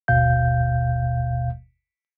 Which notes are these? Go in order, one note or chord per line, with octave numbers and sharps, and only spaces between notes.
G1 D#2 B2 F5 G6